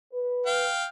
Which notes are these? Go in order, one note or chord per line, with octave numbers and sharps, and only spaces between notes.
B4
F5 G5